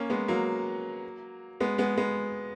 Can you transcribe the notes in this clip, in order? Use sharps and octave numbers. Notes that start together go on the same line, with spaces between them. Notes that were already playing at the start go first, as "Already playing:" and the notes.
Already playing: A#3 C#4
G#3 B3
F#3 A#3
G#3 B3
G#3 B3
G#3 B3